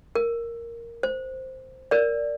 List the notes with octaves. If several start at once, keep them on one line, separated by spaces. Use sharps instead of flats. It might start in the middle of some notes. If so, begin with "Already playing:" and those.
A#4
C5
A#4 D5